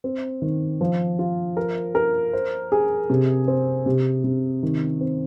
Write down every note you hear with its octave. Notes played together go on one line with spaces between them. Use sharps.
C4
D#3
F3
F4
A#4
A#4
C5
G#4
C3
C4
C3
C3
D#3
C4